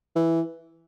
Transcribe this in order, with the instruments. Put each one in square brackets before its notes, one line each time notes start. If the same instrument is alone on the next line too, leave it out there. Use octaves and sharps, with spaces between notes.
[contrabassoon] E3